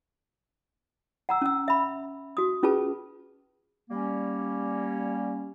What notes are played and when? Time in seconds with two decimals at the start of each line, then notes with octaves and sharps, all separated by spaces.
1.29 F#5 A#5 E6
1.42 C#4 E6
1.68 E5 B5
2.37 F#4 D#6
2.63 C#4 F4 G#4 B4 A5
3.90 G3 A#3 C#4